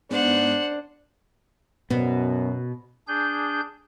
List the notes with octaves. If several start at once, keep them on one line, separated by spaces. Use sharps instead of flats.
G#2 B3 D4 C5 F#5
F#2 B2 B3
D4 G#4 G6